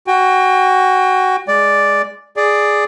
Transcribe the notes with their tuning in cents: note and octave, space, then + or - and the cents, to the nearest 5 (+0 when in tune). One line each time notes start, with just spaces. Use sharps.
F#4 +15 G5 +30
G#3 +0 D5 +0
G#4 +0 D5 +5